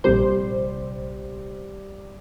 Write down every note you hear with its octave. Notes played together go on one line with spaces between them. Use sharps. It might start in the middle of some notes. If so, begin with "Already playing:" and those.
A#1 C3 G3 C5